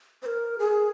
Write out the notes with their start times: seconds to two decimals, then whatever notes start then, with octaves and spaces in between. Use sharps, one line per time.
0.23 C5
0.26 A#4
0.59 G#4